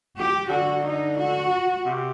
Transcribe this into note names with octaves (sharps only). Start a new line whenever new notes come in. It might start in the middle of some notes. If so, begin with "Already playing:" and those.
G4
D3 F#4
D#4
F#4
C3